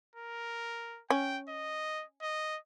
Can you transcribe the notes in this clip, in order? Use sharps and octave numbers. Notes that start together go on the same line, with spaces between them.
A#4
C#4 G5
D#5
D#5